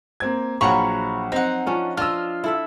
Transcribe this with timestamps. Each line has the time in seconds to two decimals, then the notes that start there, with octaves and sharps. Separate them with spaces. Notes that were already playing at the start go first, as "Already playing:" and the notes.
0.20 A#3 C4 G#6
0.61 A#1 F3 F#3 F#5 A#5 B5 C#6
1.32 C4 D#4 F#5
1.66 F3 C#4 D4 F4
1.97 D4 F4 D#5 E6 F6
2.44 E4 A4 E5